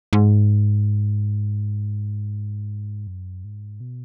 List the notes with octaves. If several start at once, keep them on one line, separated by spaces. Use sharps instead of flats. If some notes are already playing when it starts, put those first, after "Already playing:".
G#2
F#2
G#2
B2